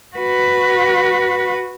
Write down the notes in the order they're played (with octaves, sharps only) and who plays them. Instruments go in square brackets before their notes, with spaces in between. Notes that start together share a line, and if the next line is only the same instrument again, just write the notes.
[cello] F#4 B4